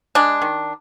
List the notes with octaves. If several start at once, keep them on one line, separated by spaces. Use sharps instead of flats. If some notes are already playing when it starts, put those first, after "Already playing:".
G#3 D4
D#3